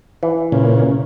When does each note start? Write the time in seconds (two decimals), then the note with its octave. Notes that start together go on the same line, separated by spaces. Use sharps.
0.23 E3
0.52 A#2 C#3